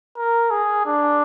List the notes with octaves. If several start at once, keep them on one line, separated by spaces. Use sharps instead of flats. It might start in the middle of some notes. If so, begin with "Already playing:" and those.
A#4
G#4
D4